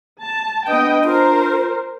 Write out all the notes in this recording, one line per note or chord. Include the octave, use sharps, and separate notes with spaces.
A5
B3 D4 B4 D#5 G5
F4 A#4 C5